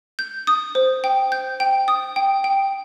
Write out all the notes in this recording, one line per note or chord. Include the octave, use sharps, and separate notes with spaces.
G6
D#6
C5
G5
G6
G5
D#6
G5
G5